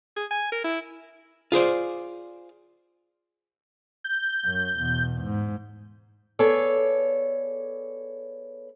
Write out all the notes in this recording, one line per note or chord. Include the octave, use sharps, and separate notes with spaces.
G#4
G#5
A#4
E4
F4 G#4 C5 D5
G6
F#2
E2 B2
G#2
B3 G#4 A4 C#5 D5